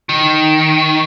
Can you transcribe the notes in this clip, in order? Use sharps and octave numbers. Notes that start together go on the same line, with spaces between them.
D#3